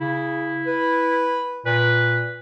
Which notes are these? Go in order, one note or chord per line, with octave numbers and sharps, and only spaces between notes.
C#3 E4
B4
A#2 B4